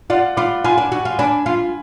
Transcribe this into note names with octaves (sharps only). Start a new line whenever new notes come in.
F4 D5 F#5
F4 B5 D6
F4 G#5 B5
D4
F#4
F4
D4 G#5 B5
F4